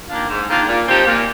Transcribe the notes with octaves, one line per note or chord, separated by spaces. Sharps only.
D#3 A#3 D4 F4
G#2
D#3 A#3 D4 F4
A#2
F3 C4 D#4 G4
A#2